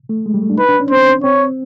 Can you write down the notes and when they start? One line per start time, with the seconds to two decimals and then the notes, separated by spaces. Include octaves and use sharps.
0.09 A3
0.26 G#3
0.34 G3
0.42 A3
0.50 D4
0.58 D#4 B4
0.69 D4
0.80 C#4
0.91 C4 C5
1.23 C4 C#5